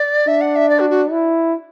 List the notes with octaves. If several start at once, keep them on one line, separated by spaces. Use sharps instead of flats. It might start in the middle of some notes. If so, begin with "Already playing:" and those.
Already playing: D5
D4 E5
F#5
E5
D5
F#4
F#4
E4